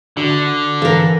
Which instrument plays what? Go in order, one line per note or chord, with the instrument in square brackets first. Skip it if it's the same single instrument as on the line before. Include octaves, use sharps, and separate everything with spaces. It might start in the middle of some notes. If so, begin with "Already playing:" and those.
[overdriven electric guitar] D3 [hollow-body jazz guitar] D4 F#4 E5
[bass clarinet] E3 [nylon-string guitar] A4 A#4 [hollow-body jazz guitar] F5